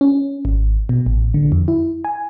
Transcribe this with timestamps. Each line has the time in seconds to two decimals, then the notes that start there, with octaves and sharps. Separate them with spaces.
0.01 C#4
0.45 G#1
0.89 B2
1.06 A1
1.34 D3
1.52 F2
1.68 E4
2.05 G#5